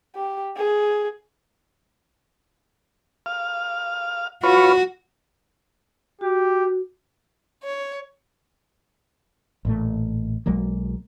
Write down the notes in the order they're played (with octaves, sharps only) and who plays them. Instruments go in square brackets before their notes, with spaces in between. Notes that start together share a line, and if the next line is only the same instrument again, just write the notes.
[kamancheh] G4
G#4
[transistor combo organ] F5
[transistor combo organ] F4 B4 C#5 [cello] F#4
[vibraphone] F#4 [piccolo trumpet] G4
[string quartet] C#5
[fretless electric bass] A1 A#2 A3
B1 F#3 G#3 A#3